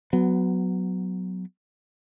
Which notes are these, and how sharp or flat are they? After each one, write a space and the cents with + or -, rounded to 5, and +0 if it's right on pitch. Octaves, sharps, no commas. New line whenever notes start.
F#3 +0 B3 +15